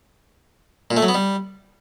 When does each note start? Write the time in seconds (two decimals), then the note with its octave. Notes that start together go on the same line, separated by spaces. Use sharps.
0.91 A#2
0.97 A3
1.02 F#3
1.08 B3
1.14 G3